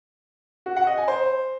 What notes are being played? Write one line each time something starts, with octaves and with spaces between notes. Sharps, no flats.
F#4
F#5
D#5
G#5
C5